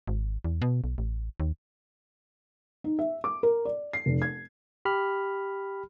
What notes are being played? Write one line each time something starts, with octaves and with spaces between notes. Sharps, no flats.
G#1
E2
B2
B1
A1
D#2
D#4
E5
D6
A#4
D5
C7
F1
G#6
G4 B5 F6